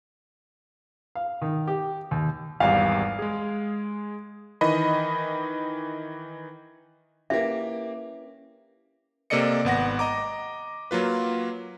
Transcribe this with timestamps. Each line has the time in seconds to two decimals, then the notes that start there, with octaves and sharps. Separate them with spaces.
1.15 F5
1.42 D#3
1.68 G4
2.11 D#2
2.60 G#1 E2 G3 F5
3.19 G#3 G#4
4.61 D#3 E3 D#5 B5
7.30 A#3 C#4 E4 G4 B4 E5
9.30 C3 A#3 A4 D5 D#5 C#7
9.65 G#1 B3 F#5 A#6
9.99 D#5 A#5 D6
10.91 F#3 A#3 F4 B4